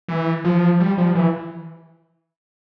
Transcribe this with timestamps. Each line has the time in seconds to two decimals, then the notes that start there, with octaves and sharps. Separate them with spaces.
0.08 E3
0.44 F3
0.80 G3
0.98 F3
1.15 E3